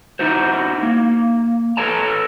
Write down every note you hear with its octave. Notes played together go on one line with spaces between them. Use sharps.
D#4 E4 F#4 C5
A#3
A4 B4 C#5 A5 A#5